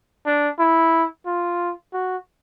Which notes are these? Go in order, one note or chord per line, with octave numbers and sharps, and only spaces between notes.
D4
E4
F4
F#4